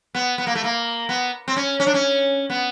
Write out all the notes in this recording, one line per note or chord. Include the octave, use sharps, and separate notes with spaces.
B3
B3
A#3
A3
A#3
B3
C4
C#4
C#4
D4
C#4
B3